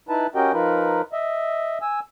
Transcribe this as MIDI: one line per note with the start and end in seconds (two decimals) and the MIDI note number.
0.09 0.27 63
0.09 0.27 64
0.09 0.27 71
0.09 0.27 81
0.35 0.52 61
0.35 0.52 66
0.35 0.52 67
0.35 0.52 70
0.35 0.52 75
0.35 0.52 79
0.53 1.02 53
0.53 1.02 63
0.53 1.02 65
0.53 1.02 70
0.53 1.02 71
1.13 1.78 75
1.13 1.78 76
1.82 2.00 80
1.82 2.00 88